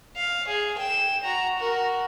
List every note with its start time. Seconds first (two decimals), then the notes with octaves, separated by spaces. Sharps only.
0.16 F5
0.48 G#4
0.79 G5 E7
1.24 F#4 A#5
1.58 F#4 A#4